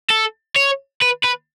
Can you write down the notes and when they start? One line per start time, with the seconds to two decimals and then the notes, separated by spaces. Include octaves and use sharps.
0.11 A4
0.56 C#5
1.02 B4
1.25 B4